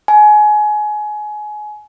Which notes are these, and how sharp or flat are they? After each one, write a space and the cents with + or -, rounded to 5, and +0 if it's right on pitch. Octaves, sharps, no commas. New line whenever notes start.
G#5 +25